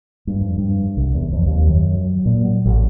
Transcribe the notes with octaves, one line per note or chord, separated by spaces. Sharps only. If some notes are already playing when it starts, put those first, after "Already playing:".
G2
F2
G2
C2
E2
F2
D#2
F#2
F#3
A#2
F#3
A1